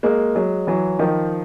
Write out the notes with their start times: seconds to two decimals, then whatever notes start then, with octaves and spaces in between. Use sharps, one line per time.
0.03 G#3 A#3
0.35 F#3 G#3
0.67 E3 F#3
0.99 D#3 F3